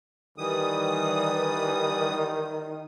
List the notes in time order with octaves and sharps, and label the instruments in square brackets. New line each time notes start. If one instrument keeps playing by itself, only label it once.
[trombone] D#3 [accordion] E3 G3 D#6